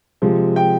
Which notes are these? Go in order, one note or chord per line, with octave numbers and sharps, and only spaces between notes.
C3 F3 G#3
G5